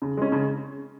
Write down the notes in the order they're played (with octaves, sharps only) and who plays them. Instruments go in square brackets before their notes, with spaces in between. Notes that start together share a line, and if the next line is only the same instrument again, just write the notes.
[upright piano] C#3
G#3 C#4
C#3